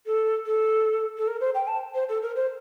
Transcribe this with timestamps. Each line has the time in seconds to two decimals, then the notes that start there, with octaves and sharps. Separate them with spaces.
0.06 A4
0.46 A4
1.17 A4
1.27 A#4
1.40 C5
1.54 G5
1.67 A5
1.94 C5
2.09 A4
2.22 A#4
2.36 C5